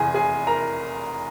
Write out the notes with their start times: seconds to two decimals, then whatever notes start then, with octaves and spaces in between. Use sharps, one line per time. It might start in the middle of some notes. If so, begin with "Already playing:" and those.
Already playing: F1 E2 E3 G#4 G#5
0.14 G#4 G#5
0.47 A#4 A#5